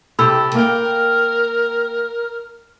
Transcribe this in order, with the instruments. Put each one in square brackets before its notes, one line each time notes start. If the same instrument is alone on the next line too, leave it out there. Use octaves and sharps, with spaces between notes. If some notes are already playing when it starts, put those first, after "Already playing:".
[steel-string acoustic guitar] C3 G4 A4 [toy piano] B5 E6
[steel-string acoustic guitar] A#3 F5 G5 [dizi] A#4